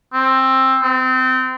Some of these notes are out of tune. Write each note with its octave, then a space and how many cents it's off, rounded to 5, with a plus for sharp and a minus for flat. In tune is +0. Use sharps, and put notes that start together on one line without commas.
C4 +15
C4 -25